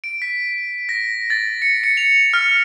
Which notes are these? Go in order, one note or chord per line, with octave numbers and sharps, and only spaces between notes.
D7
B6
A#6
A6
C#7
C#7
F7
F6